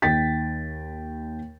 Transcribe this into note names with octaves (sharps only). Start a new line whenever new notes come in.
D#2 D#4 G5 A6 B6